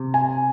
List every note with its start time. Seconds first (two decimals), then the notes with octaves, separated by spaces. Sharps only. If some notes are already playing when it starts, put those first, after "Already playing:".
Already playing: C3
0.14 G#5